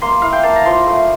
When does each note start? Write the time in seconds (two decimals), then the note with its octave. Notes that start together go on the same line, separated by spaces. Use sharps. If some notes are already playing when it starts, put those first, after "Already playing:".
0.02 A#3 C6
0.22 E4 F5
0.33 G5
0.43 A#3 A5
0.56 A#5
0.65 F3 C6
0.87 A3